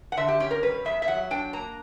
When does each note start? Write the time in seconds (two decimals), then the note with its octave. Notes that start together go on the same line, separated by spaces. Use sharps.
0.12 F#5
0.17 D3 E5
0.28 G4
0.40 C#4 G4
0.51 A#4
0.63 G3 B4
0.85 E2 E5
1.02 E5
1.08 F#3 F#5
1.31 D4 G5
1.53 A#3 A#5